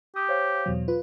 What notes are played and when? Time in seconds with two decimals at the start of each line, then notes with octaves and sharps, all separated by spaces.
0.16 G4 D#6
0.29 C5 C#5 F5
0.66 E2 B2 F#3
0.88 F4 B4